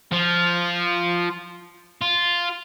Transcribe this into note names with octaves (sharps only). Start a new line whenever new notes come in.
F3 F4
F4